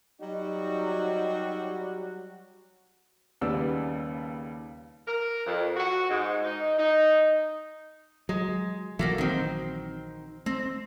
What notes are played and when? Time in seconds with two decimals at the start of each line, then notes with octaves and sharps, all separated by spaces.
0.21 F#3 G3 D#4 F#4
3.41 D#2 C#3 G3 B3 D5 E6
5.07 A#4
5.46 F2
5.77 F#4
6.09 G#2
6.43 D#4
6.78 D#4
8.29 F#3 G#3
8.99 A#1 E3 F#3 A3 A#3 F#4
9.18 D#3 C4
10.46 A3 C4